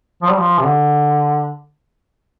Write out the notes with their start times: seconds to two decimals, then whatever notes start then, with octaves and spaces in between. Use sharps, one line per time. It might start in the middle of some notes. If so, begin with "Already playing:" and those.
0.22 F3
0.31 G3
0.39 F3
0.59 C3
0.64 D3